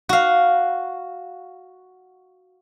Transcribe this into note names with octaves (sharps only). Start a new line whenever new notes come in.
F#4 F5